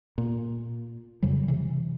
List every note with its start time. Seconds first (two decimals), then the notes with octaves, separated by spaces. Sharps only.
0.18 A#2
1.23 F2 C#3 F#3 G3
1.48 C3 E3